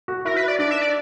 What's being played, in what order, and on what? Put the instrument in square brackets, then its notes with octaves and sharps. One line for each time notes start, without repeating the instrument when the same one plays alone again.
[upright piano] F#4
[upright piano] E4 [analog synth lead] A#4
[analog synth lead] B4
D5
[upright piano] D4 [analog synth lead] D5
[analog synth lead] E5
D5